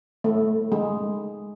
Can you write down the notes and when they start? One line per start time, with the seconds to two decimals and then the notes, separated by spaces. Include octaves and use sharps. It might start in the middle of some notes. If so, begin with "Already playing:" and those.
0.24 A3
0.72 G#3